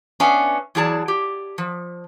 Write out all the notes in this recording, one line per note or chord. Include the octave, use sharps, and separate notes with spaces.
B3 C#4 D4 E5 F5 G#5
E2 F#3 E4 G#4 D5 A5
G4
F3